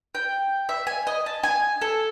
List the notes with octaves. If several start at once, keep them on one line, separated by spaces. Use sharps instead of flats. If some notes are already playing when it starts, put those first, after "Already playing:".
G5
E5
G#5
D#5
A5
G#5
A4